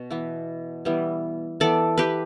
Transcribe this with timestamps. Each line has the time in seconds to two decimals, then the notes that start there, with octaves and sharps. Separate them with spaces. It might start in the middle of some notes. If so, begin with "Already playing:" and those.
Already playing: B2
0.11 E3 B3
0.85 E3 G3 B3
1.60 E3 B3 A4 D5
1.98 G4 B4